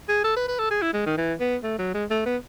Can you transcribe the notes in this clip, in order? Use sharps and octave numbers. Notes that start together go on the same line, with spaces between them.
G#4
A4
B4
B4
A4
G#4
E4
G#3
D#3
E3
B3
A3
F#3
G#3
A3
B3